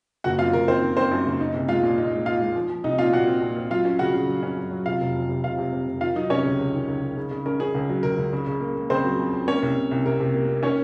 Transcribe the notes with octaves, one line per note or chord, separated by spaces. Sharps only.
F#1 F#4 F#5
F#2 F4 F5
F#1 A#4
D#3 C4 C5
D#3
D#3 C4 C5
F#2
F#1
D#4
C2
G#3 F4 F5
A#2
D#4
G#3
D#4 F4 F5
G#3
F3
F3
C2 D#4 D#5
A#2 F4 F5
A#2 F#4 F#5
C4
A#2
C4
F#3 F4 F5
C#4
C#3 F#4 F#5
C#3
F#3
C#4
F#2
F#3
C3 F4 F5
F1
F2
C3
F1 F4 F5
C3
C3
F1
D#3 F4 F5
F#3 D#4 D#5
C3 C#4 C#5
C#2
C#2
D#3
C#2
D#3
C#3
C#3
C#4 A#4
C#4 G#4
C#2
F#3
C#2 A#4
C#2
C#3
C#3
A#3
A#3
C#3 C4 C5
F#3
F2
F2
A#3 C#4 C#5
C2
C2
C2
C3 A#4
C3
A#3
A#3
D#3 C#4 C#5